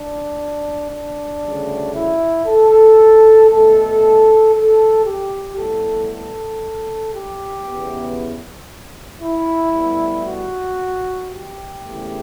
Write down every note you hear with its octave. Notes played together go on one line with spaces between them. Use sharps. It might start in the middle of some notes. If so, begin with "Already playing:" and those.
Already playing: D4
D4
D2 C#3 G3
E4
A4
B2 A3 A4
A4
G4
A2 G3 B3 A4
A4
G4
E2 C#3 E3 B3
E4
A2 G3 B3
F#4
G4
E2 C#3 E3 A3